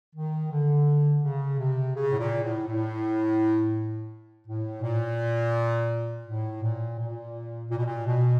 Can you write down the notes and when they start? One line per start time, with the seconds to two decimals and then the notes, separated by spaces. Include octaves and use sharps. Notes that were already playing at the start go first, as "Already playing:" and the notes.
0.16 D#3
0.52 D3
1.24 C#3
1.59 C3
1.96 C#3
2.12 A2
2.19 A#2
2.43 A2
2.67 A2
4.47 A2
4.82 A#2
6.27 A2
6.63 A#2
6.99 A#2
7.71 A#2
7.78 B2
7.86 A#2
8.07 B2